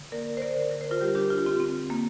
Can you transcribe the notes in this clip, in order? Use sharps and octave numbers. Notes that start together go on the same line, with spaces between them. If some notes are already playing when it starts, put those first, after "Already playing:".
Already playing: D3
A#3 A#4 D5
C5
A#4 D5
D3
A#4
C5
F4 A#4
G3 G4
A#4
D4 G4
F4
G4
D3 C4 F4
C4
A#3